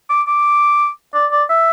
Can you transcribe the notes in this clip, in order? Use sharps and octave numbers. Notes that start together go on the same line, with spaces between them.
D6
D6
D5
D5
E5